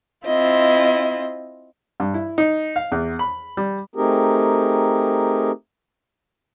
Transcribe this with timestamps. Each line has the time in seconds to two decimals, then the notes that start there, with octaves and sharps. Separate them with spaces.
0.25 C4 E4 F4 D#5
2.00 G2
2.14 E4
2.38 D#4
2.76 F5
2.92 E2
3.19 B5
3.57 G3
3.96 A3 C4 D#4 G4 G#4 A#4